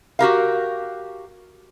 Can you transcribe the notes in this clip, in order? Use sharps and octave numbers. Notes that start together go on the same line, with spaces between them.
F#4 G4 A#4 F5